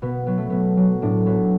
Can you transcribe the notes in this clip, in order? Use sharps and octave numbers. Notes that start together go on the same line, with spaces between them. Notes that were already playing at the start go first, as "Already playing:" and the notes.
B2 B3
F#3 B3
A3
B2 B3
F#3
A2 D4
F#3 B3